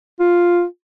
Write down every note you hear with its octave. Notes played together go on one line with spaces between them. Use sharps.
F4